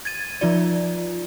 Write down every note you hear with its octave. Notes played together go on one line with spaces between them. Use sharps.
G#6 A6 D#7
F3 D#4 F4 D5